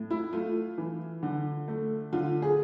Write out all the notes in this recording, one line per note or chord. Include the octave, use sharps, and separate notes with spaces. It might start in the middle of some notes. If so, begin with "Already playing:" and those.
Already playing: A2
E4
A3 F4
E3
D3
A3
D3 F4
G#4